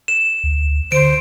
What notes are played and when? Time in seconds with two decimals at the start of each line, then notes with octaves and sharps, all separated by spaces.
0.08 E7
0.44 D2
0.92 D3 C5 D7